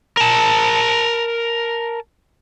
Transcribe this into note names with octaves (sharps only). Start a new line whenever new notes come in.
A#4 A5